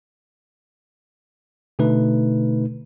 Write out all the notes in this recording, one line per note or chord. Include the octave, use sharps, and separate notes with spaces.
B2 D3 A3 D#4 B4